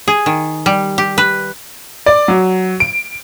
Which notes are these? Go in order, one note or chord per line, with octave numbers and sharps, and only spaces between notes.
G#4
D#3
G3
G4
B4
D5
F#3
D7